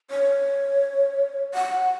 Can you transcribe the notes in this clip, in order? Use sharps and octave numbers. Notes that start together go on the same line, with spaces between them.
C#5
F#5